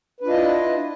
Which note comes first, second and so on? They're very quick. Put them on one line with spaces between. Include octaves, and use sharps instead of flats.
B4 D4 F4 D#5 E4